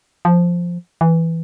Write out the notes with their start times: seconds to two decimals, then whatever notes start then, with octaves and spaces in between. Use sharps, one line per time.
0.25 F3
1.01 E3